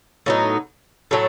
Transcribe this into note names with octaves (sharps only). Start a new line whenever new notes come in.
A2 F#3 B3 D#4
A2 F#3 A3